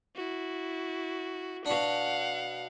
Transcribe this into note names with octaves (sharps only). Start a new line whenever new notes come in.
E4 F#4
B2 D4 F5 F#5